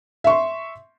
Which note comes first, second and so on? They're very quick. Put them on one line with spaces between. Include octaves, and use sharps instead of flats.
E5 C#6 C6